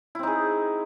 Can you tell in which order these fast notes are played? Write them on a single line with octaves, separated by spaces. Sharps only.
E4 C4 D#4 G#4